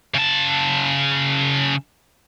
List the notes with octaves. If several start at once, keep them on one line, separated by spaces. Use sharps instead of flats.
C#3 A5